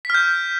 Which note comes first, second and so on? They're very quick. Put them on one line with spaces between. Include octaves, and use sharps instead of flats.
B6 F6 G6